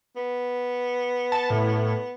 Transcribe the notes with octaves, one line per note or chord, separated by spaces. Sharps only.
B3
A5
A2